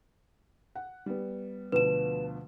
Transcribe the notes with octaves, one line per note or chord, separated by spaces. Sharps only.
F#5
G3 B3
D2 B2 F3 B4 E7